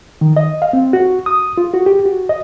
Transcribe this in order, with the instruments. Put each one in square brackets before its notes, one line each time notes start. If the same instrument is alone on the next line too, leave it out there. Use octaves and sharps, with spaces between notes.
[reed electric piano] D#3
D#5
F5
C4
F#4
D#6
F4
F#4
G4
F#4
D#5